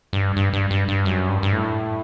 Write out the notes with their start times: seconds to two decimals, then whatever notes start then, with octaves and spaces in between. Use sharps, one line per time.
0.13 G2
0.36 G2
0.53 G2
0.71 G2
0.88 G2
1.05 F#2
1.29 G2
1.43 G2
1.52 A2